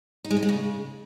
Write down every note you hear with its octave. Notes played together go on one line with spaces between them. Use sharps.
D#4
G#3
C4
G#3
C#3